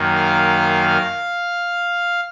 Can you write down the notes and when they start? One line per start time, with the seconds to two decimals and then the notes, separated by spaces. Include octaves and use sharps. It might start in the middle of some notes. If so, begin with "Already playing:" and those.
Already playing: F#2 D#3 A#3
0.16 F5